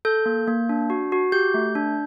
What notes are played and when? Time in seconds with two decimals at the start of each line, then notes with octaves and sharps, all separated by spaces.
0.05 A4 G6
0.26 A#3
0.48 A#3
0.69 D4
0.90 F#4
1.12 F#4
1.32 G4 G6
1.54 A3
1.75 D4